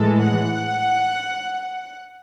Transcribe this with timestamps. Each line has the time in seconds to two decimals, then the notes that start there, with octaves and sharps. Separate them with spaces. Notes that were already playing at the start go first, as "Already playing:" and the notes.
Already playing: A2 E3 G#3 A4
0.24 F#5